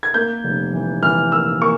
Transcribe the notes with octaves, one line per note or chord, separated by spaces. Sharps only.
G#6
A#3 G6
F1
E3
E3 F6
A#3 E6
A#3 C#6